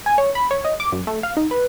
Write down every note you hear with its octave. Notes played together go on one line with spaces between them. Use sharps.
G#5
C#5
B5
C#5
D#5
D6
F#2
A3
F5
D#4
B4